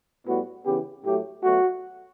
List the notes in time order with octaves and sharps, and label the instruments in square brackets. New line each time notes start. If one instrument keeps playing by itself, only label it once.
[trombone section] A2 G3 B3 F#4
C#3 E3 B3 G4
A2 F#3 A3 G4
B2 F#3 A3 F#4